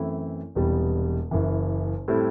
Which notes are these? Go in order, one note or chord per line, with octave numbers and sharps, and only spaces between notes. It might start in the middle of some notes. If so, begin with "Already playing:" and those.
Already playing: F#2 E3 A3 C4 E4
E1 E2 C3 G3 B3
F#1 F#2 E3
A2 G3 C4 E4